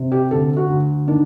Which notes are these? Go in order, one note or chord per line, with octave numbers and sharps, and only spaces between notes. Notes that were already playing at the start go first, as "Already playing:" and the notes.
Already playing: C3
G4
D2 A4
F#4
D2
D#3 D4